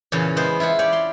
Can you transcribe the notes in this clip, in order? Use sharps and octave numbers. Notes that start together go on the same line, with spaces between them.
E2 A#2 C#3 A4 F5 A5
G#3 B3 C5 C6
E4 F4 C5 F#5
G4 C#5 D5
C6